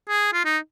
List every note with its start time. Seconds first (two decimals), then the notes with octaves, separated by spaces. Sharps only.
0.09 G#4
0.33 F4
0.45 D#4